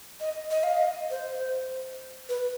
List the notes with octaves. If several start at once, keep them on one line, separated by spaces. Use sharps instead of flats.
D#5
D#5
F5
D#5
C5
B4